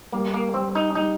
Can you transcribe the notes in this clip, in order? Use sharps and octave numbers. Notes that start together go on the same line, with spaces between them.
G3 A#3
A#3
G3 C4
D#4
G3 D#4